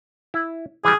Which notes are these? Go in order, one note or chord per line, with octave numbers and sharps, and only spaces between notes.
E4
E3 G3 G#4